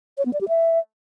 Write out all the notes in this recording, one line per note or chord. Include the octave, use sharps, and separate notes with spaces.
C#5
B3
D5
G4
E5